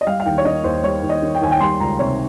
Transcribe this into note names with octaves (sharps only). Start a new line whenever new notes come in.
D#5
G3 F5
F5
D#2 G5
C#5
D#3 D#5
D#2 C5
G3 C#5
D#2
D#5
D#3
G5
D#2 G#5
G5
G3 C6
C#2 A#5
C3 C#5